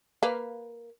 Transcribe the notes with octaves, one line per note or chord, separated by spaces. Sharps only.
A#3 B4 F5